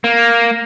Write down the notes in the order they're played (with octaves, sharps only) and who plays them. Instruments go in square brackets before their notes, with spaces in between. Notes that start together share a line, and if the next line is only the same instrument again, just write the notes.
[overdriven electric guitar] A#3